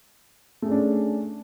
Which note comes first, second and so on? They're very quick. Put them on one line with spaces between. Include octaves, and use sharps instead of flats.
A3 G#4 C#4 D4